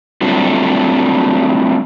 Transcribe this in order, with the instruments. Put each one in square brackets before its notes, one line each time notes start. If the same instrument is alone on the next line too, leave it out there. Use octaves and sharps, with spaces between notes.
[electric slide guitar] F#3 G3 A3 C4 D4 F4